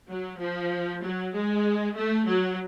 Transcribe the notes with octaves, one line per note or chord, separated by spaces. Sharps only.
F#3
F3
F#3
G#3
A3
F#3